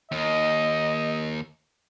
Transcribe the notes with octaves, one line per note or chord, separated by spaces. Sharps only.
D#2 D#5